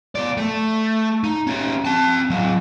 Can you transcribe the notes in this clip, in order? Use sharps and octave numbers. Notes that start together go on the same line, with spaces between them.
B2 D5
A3
D#4
C#4 G4
C4 A5
F#3 C4